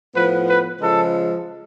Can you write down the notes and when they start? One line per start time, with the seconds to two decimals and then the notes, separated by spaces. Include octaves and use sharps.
0.15 A2 F3 B3 B4
0.47 B4
0.80 C#3 F3 G#3 A4